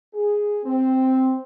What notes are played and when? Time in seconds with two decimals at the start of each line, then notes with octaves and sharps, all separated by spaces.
0.15 G#4
0.64 C4